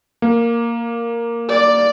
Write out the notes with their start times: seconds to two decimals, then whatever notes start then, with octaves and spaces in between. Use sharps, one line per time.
0.22 A#3
1.49 D5